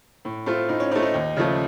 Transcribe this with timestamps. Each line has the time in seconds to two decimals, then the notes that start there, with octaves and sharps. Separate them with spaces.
0.25 A2
0.46 A3 C4 F4
0.69 A2 D#4
0.80 C#4
0.91 C4 D#4
0.95 A3
1.03 D#4
1.14 D#2
1.36 C#3 F3 A3